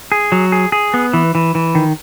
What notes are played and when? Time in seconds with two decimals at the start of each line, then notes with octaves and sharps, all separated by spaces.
0.12 G#4
0.32 F#3
0.52 G#4
0.72 G#4
0.94 B3
1.14 E3
1.35 E3
1.55 E3
1.75 D#3